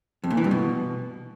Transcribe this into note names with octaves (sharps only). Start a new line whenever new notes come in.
F2
A#2
E3
G2
B2